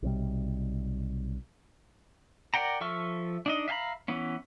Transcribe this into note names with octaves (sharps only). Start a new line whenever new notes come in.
B1 C3 D#3 G3
A#4 D5 F#5 G5 A#5
F3 A4 E5 C#6 F6
D4 D#4 D#5
E5 F5 G5 A#5 B5
E3 B3 C#4